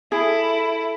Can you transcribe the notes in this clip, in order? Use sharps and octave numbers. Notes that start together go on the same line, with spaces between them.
E4 G#4 A4